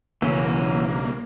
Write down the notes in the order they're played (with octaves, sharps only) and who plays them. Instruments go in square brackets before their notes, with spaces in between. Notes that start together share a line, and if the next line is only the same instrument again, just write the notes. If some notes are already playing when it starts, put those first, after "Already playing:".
[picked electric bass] B1 C#3 [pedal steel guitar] E3 F#3 C#4 [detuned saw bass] A#3